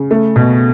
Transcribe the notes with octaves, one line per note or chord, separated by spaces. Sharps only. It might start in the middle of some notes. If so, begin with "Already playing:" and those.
Already playing: C#3
A3
B2